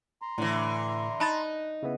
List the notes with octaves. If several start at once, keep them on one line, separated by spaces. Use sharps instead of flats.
A#5 C6
A2 D3 E3
D#4 A5 B5 F#6 A6
C#3 B3 E4